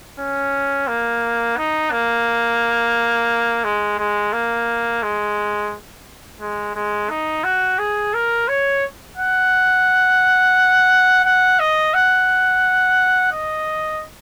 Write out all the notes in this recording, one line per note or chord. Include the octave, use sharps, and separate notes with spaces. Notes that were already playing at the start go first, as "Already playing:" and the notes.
C#4
A#3
D#4
A#3
G#3
G#3
A#3
G#3
G#3
G#3
D#4
F#4
G#4
A#4
C#5
F#5
F#5
D#5
F#5
D#5